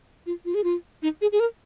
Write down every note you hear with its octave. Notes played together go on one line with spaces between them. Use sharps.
F4
F4
G#4
F4
D#4
G#4
G#4
A#4